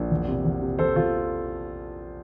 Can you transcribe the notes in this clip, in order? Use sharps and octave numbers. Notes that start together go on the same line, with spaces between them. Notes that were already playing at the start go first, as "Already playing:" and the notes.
Already playing: A#1
E2
C3
E2
C3
E2 A4 C5
E2 F4 A4